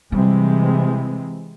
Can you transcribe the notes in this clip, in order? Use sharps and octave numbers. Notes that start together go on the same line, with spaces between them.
C3 E3 G3 G#3